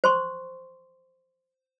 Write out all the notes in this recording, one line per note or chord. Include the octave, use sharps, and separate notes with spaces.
C5 C6 C#6